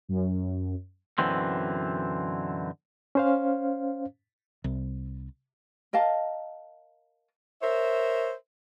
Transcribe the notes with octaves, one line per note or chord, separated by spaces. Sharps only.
F#2
F#2 B2 D3 E3 C4
C#4 C5 F5
C2
A#4 D#5 F5 A5
A#4 C5 C#5 E5